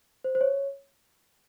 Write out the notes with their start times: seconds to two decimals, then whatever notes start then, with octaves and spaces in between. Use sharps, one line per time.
0.24 C5
0.35 C5
0.41 C#5